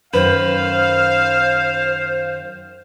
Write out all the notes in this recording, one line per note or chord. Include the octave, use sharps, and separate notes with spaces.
F#2 D#3 B4 C5 F5